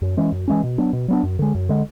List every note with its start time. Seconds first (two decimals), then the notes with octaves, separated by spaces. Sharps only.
0.02 F#2
0.17 E3 G#3 C#4
0.32 F#2
0.48 E3 G#3 C#4
0.64 B2
0.78 F#3 B3 D4
0.93 B2
1.08 F#3 B3 D4
1.23 F#2
1.39 D3 G#3
1.55 F#2
1.69 D3 G#3